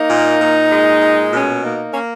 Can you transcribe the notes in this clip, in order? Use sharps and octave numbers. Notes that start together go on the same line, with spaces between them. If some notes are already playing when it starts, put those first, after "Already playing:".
Already playing: A#3 D#4
A#2
A#2
G#3
A#2
B2 C#4
A#3 D#4
A#3 C#4